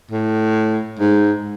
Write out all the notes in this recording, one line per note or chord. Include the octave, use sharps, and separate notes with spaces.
A2
G#2